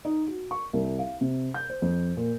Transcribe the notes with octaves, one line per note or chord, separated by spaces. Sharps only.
D#4
F#4
C#6
C2
F5
C3
G6
C5
F2
A#2